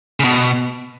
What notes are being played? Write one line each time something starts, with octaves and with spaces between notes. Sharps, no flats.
C#3
B2